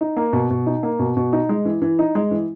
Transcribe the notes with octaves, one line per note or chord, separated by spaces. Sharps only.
D#4
A#3
B2
B2
D#4
A#3
B2
B2
D#4
G#3
E3
E3
D#4
G#3
E3